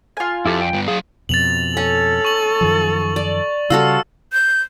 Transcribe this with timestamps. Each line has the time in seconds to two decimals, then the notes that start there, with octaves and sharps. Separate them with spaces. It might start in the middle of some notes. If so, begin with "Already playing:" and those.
0.17 F4 G#5
0.46 F2 E4 G4 A4
0.61 G5
0.73 G2 B3
0.88 F#3 G#4 F5
1.29 F2 B2 A6 F7 F#7
1.77 C#4 A4
2.25 C#6 F#7
2.61 F#2 D#3 F3
3.16 D5
3.70 C#3 G3 F4 F#4 A4 E6
4.33 G6